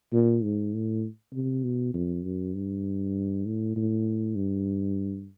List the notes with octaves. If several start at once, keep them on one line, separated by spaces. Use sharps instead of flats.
A#2
G#2
A2
C3
B2
F2
F#2
G2
A2
A2
G2